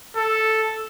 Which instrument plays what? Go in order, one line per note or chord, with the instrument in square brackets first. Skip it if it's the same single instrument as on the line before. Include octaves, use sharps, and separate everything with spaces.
[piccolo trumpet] A4